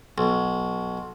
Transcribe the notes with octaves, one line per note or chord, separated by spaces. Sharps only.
B1